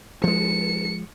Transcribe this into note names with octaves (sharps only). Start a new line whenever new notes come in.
F3 G#3 C#7